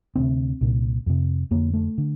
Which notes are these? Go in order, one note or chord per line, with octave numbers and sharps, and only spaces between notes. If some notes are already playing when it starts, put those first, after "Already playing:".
D2 C3 C4
C2 A#2
F2 C3
F2 D3 A#3
A3
D3